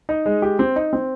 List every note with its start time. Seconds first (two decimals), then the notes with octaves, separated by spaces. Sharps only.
0.09 D#4
0.26 G#3
0.42 G4
0.59 C4
0.76 D#4
0.93 C4